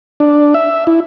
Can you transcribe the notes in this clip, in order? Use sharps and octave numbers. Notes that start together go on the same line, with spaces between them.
D4
E5
E4